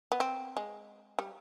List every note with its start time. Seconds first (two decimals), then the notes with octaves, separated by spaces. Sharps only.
0.12 B3
0.20 C4
0.57 G#3
1.19 G3